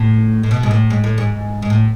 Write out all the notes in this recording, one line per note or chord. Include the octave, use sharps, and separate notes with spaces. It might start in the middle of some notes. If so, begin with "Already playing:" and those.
Already playing: A2
A2
B2
G#2
A2
G#2
A2
G#2
G#2
A2